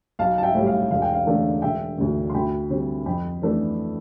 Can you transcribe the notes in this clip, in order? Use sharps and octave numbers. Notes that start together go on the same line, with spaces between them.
B1 F5 A5
A5
E5 G5
A2 G3
F5
E1 F5
G5
F5
E2 D3 A3 D4
E1 E5 G5
D2 D3
C6
D2 G5 B5
D3 G3 C4
F2 G5 B5
E3 A3 D4